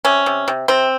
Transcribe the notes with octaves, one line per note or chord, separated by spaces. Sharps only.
C3 C#4
C3
C3
C3 C4